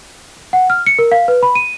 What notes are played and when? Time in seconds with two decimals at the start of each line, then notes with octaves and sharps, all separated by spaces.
0.53 F#5
0.70 F6
0.86 C#7
0.99 A#4
1.12 F5
1.28 B4
1.43 B5
1.55 D#7